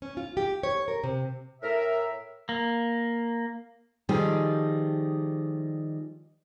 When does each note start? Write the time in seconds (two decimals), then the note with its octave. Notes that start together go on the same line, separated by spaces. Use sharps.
0.02 C#4
0.17 F4
0.37 G4
0.63 C#5
0.88 A#4
1.04 C3
1.62 A2 A#4 E5
2.49 A#3
4.09 D#3 F3 G3 A3 D#4 G#4